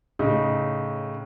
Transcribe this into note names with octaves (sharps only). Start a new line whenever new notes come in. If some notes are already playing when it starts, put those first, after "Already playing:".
A2 C#3 D#4